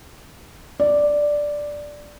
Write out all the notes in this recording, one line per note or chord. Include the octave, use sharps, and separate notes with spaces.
D5